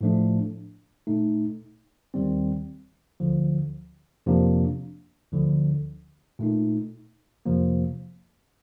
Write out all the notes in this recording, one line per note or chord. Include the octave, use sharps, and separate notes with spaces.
A2 F3 A3 D4
A#2 A3 D#4
D#2 D#3 G3 C4
D2 D3 F3
F2 C3 F3 A#3 D4
D2 D3 F3
A#2 A3 D#4
F2 C3 F3 A#3